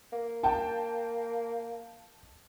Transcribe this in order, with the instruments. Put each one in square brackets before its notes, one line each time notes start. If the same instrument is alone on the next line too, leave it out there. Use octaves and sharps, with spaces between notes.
[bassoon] A#3
[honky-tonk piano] G5 A5